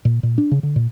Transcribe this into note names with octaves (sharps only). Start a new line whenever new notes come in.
A#2
A#2
D4
C#3
D3
A#2